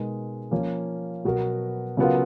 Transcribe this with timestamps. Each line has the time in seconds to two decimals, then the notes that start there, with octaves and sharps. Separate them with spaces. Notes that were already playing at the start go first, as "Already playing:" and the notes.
Already playing: B2 G#3 D#4 A#4
0.51 F3 A#3 C#4
1.25 B2 F#3 B3 F#4 A#4
1.97 C#3 F#3 B3 F4 A#4